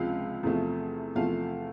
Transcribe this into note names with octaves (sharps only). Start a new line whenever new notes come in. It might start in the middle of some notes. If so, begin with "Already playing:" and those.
Already playing: C#2 C3 F3 F4 F5
E2 C3 F3 A3
E2 C3 F3 A3 F4 F5